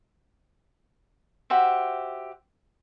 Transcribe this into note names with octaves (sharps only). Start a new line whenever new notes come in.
F#4 G4 C5 E5